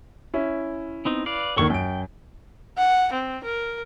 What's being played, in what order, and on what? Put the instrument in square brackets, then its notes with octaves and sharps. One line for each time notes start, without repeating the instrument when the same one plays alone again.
[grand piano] C#4 E4
[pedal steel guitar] B3 C4 D#4
B4 D5 F5
[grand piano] A#1 D#2 D#3 [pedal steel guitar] F#3 A4 C#6
[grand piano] F#2 D7 [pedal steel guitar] G5
[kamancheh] F#5
C4
A#4